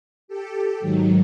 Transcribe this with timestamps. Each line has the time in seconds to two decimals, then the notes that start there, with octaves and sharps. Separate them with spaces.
0.28 G4 A4
0.80 G#2 D#3 F#3